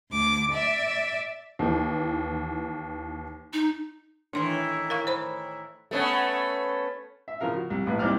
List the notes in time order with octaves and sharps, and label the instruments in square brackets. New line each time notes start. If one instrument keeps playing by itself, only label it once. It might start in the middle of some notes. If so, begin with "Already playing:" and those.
[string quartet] D2 D6
D5 E5
[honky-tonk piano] D#2 E3
[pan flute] D#4
[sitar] A2 D#3 E3 [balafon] D4 C6
[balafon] A#4 F5 C#6
C5 B5
[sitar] A3 B3 C#4
[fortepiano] E5
C#3 F3 A#4 F5
F#4
C2
A#1 A2 B4
C2 A#2 C4 D#4 D5 F6